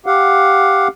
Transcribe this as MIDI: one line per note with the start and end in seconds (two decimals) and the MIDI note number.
0.06 0.88 67
0.06 0.88 77
0.06 0.88 78